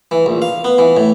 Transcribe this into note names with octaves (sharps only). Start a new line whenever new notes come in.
E3
A#1
F5
B3
E3
A2